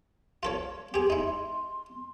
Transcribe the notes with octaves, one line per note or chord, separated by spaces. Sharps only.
F4 A4 C#5
G4 G#4 C6
D#4 E4